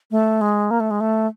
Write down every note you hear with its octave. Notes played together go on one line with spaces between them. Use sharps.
A3
G#3
A#3
A3
G#3
A3